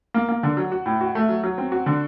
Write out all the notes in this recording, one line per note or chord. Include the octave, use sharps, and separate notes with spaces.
A#3
A#3
D3
F#3
F#4
A2
F#4
A3
F#3
F#3
C4
F#4
D3